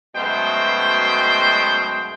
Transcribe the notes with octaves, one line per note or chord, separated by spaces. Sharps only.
F#2 B2 G#3 A3 C5 G5